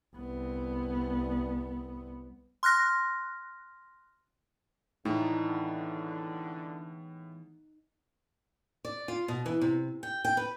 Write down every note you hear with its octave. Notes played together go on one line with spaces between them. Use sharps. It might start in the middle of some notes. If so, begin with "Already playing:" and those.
C2 B3
C6 F6 F#6 A#6
A2 D3 E3 G#3 B3 D#4
D5
F4
B2
E3
C3
G5
G5
B4